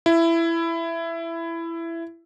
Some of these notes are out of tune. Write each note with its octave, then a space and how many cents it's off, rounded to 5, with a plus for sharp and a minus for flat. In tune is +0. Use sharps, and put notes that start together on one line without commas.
E4 +15